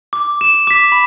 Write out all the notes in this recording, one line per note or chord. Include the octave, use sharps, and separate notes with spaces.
D6
E7
D6 B6
B5